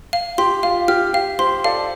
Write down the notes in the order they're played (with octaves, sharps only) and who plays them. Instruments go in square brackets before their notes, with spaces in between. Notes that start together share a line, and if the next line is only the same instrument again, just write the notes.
[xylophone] F5
[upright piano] G4 [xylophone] C6
[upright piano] F4 [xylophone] F5
[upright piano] G4 [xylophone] F6
[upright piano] G4 [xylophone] F5
[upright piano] G4 C5 [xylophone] C6
[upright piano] A4 D5 [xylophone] F5